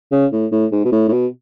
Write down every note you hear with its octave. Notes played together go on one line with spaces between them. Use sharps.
C#3
A2
A2
G#2
B2
A2
A2
B2